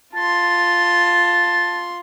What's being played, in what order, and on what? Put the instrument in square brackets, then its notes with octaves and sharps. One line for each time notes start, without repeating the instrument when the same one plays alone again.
[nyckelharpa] F4 C6 [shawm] A5